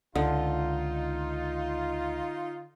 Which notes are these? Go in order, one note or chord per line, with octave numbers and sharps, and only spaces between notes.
C#2 D3 D#4 F4